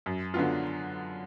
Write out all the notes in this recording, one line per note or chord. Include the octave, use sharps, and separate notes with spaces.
F#2
D3 F#3 B3 F4